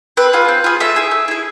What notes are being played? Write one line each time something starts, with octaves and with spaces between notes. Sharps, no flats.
C4 B4
F4 G#4
C4
F4 G#4
A3 E5
E4 G#4
A3
E4 G#4